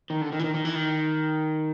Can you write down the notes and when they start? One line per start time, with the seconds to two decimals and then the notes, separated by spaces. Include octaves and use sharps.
0.10 D#3
0.21 D3
0.32 D#3
0.39 E3
0.44 D#3
0.54 D#3
0.65 E3
0.75 D#3